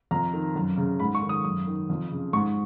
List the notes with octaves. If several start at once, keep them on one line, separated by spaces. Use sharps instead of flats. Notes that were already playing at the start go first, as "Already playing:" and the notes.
F2 A#5
D#3
F#2
C#3
G#2 B5
C#6
D#3
D#6
F#2 D#6
D#3
F2
C#3
G#2 C#6